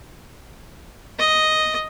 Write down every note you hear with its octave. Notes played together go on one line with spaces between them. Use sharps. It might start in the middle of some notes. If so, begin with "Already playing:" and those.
D#5